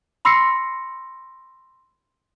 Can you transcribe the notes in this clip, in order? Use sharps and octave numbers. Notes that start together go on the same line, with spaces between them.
B5 C6 E6 A#6 C7 C#7